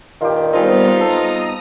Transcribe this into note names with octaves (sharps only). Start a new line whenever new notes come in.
G2 A#2 D#3 F4 G4
G3 B3 C4 D#4 F4 G#4 B5
A4 A#5 D#6